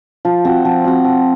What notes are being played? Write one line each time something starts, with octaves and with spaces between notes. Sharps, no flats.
F3
C4 F#4
F3
C4 F#4
F3